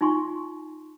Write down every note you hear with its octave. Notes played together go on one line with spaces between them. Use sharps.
D#4 F4 G#5 C6 C#6